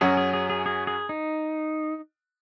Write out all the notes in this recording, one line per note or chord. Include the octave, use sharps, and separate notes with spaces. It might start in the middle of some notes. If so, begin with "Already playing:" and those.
F#2 F#3 C#4 F#4 G#4
G#4
G#4
G#4
G#4
G#4
D#4